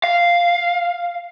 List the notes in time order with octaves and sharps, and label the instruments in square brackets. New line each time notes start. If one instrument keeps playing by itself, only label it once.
[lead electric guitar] F5